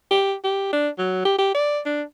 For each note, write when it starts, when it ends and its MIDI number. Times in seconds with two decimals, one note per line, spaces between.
0.11 0.34 67
0.44 0.71 67
0.73 0.89 62
0.98 1.24 54
1.25 1.34 67
1.38 1.50 67
1.54 1.80 74
1.86 2.02 62